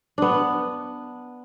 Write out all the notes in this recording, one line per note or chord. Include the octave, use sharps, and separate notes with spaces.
B3 D4